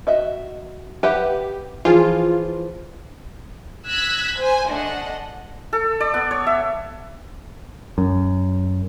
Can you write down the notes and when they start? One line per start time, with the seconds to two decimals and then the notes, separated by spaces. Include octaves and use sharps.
0.07 F#4 D#5 E5
1.03 G4 B4 E5 F#5
1.85 E3 F3 F4 G#4
3.87 E6 F#6 G#6 A#6 B6
4.39 C5 G#5
4.69 A3 D4 D#5 F#5
5.73 A4
6.00 D5
6.14 B3
6.31 C#5
6.47 E5
7.98 F#2